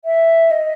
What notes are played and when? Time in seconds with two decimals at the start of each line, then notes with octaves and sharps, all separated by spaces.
0.05 E5
0.51 D#5